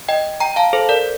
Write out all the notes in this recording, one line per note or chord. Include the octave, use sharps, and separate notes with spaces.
D#5 G5
G5 A#5
F5 A5
A4 C5
A#4 D5